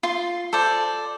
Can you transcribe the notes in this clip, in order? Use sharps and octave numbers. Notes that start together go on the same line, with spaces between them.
F4 C6
A4 C5 D5